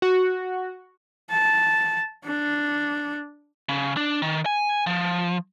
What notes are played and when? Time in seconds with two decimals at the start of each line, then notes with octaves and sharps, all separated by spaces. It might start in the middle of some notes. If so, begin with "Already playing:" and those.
0.02 F#4
1.30 A5
2.24 D4
3.69 C#3
3.97 D4
4.22 D#3
4.46 G#5
4.87 F3